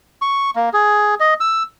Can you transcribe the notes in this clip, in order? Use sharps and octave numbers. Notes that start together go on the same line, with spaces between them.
C#6
A#3
G#4
D#5
E6